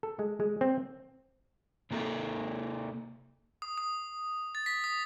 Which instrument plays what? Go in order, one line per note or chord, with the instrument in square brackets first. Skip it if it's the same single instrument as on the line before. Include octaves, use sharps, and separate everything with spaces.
[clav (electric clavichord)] A4
G#3
G#3
C4
[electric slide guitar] C3 A#3 D#4 A4
[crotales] D#6
D#6
A6
B6
D#6